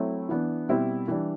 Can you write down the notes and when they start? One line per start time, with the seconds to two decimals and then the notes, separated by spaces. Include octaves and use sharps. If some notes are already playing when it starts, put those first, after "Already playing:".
Already playing: F#3 A3 C4 E4
0.29 E3 B3 D4
0.68 B2 G3 C4 E4
1.08 E3 G3 D4